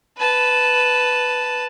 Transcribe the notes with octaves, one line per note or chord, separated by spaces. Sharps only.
B4 A5